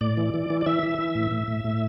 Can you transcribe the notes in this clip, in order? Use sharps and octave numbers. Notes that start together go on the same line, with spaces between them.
A2 D5
E3
E3
E3
D5
E3 E5
E3
E3
A2
A2
A2
A2